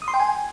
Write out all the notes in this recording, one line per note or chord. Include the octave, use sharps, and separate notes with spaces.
D#6
C6
G5
G#5